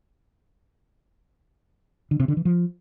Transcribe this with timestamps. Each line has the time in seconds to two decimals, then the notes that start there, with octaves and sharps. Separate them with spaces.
2.11 D3
2.20 C3
2.28 D3
2.37 E3
2.45 F3